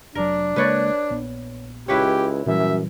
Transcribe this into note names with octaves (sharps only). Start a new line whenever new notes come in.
F1 F#3 D4 A#4
C#3 G#3 A#3 B4 C#5 D5
A#1 B3
C#2 E4 G4 B4 C#5
F#2 A#2 E3 G3 E5